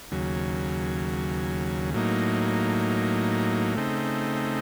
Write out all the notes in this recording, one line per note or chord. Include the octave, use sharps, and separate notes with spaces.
D#2 C#3 F#3
A2 F#3 A#3 D#4
C#3 A3 C4 D#4